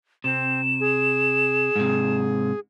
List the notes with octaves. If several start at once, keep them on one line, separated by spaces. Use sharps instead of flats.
C3 C4 E7
G#4
G#2 C3